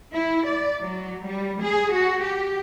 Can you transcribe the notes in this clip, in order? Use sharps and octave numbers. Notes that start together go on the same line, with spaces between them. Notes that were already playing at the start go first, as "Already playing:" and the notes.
E4
D5
F#3
G3
G#4
F#4
G4